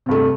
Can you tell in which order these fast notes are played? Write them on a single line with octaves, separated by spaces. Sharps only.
C3 G2 A3